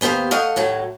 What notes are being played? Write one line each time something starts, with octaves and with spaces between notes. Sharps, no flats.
D#2 B3 G4 C5 F5
A3 D#5 F5 F#5
D#2 A2 F#3